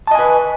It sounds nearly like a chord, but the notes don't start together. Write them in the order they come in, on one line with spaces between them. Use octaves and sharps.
A5 D#5 G#5 B4